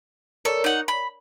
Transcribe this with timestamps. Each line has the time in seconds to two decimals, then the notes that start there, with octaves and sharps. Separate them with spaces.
0.45 A4 A#4 C#5 D5
0.64 D#4 F#5
0.88 B5